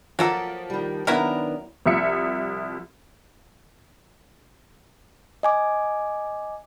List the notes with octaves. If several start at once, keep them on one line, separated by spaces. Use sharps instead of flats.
F3 F#3 A#3 A4
D#3 G3
D#3 F#3 B3 D4 E4 A#4
C2 F3 E5 C#7
D#5 G#5 D6